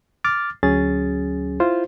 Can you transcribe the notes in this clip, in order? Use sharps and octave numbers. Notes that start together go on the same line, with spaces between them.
D6 F6 A6
D2 F#3 C#4 G#4 A6
E4 F4 C5